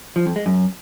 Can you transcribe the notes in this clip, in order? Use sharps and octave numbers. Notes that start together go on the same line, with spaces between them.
F3
F2
G#3
F#2